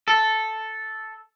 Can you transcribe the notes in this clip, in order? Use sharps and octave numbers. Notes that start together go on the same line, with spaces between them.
A4